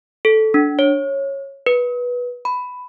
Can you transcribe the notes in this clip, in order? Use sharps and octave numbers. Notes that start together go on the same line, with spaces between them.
A4
D4
C#5
B4
B5